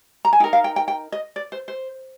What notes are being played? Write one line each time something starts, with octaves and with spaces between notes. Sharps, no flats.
A#5
G#5
D#4 A#4 G5
F5
G5
G5
G5
D#5
D5
C5
C5